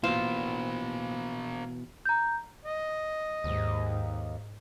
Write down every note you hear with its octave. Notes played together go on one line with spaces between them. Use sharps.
B2 E3 A#3 F4 C5 E7
A#5 G6
D#5
D#2 G#2 D#4